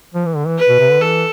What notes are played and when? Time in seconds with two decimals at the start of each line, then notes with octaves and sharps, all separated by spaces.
0.15 F3
0.26 E3
0.36 D3
0.47 E3
0.58 B4
0.69 B2
0.79 C3
0.91 D3
1.01 E3 A4